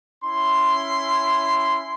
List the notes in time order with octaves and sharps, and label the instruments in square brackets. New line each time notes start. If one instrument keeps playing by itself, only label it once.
[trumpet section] C#4 E4 C6